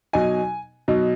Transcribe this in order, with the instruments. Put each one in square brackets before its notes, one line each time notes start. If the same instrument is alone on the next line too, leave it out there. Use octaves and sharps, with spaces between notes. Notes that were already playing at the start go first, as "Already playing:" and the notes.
[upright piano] B2 F#3 D#4 G#5
B2 F#3 D#4